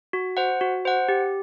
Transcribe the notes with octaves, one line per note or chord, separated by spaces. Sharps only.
F#4
C5 F#5
F#4
C5 F#5
G4